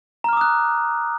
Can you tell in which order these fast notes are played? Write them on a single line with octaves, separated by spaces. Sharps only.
A#5 F6 D6 D#6 F#6